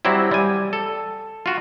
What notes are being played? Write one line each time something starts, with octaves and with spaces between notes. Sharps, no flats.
F#3 G3 C4 E4
G3 G#5
A4
F4 F#4